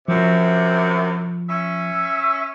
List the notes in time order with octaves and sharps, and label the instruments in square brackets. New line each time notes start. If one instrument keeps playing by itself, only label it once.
[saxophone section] F#2 C3 [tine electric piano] F3
[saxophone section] C#4 E5